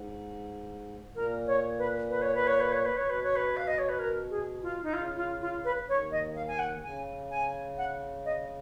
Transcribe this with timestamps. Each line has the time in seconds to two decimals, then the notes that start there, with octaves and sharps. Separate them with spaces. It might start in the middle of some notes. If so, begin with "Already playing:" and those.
Already playing: G#2
1.15 A#2 A#4
1.47 C#5
1.78 B4
2.10 B4
2.22 C#5
2.35 B4
2.47 C#5
2.60 B4
2.72 C#5
2.85 B4
2.97 C#5
3.04 B2
3.10 B4
3.23 C#5
3.36 B4
3.57 F5
3.67 D#5
3.78 C#5
3.89 B4
3.99 A#4
4.30 G#4
4.63 F4
4.83 D#4
4.94 C#3 F4
5.17 F4
5.41 F4
5.64 B4
5.88 D#2 D#3 C#5
6.11 D#5
6.36 F5
6.48 G#5
6.59 F#5
6.83 C#3 G#5
7.31 G#5
7.78 F#5
8.25 D#5